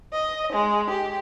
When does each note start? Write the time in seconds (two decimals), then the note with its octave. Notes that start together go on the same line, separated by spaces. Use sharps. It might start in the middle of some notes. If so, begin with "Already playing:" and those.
0.12 D#5
0.52 G#3
0.89 G4